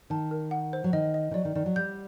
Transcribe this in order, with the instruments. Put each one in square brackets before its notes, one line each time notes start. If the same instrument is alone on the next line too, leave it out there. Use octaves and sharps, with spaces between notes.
[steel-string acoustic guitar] D#3 [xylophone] A5
[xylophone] A#4
F#5
C5
[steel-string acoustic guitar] F#3
[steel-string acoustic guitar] D#3 [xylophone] D#5
[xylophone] D#5
[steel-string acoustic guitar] D#3
[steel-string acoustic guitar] F#3 [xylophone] D5
[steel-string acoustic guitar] D#3
[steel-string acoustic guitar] D#3 [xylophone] D5
[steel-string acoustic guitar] F#3
[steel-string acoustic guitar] G3 [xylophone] G6